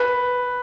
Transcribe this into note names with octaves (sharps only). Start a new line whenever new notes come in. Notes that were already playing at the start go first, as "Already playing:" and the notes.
Already playing: B4